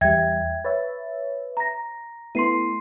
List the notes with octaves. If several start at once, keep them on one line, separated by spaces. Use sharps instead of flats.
E2 G3 E5 G5 G#6
B4 C#5 E5 A6
A#5 A#6
A3 B3 E4 C6 C7 D#7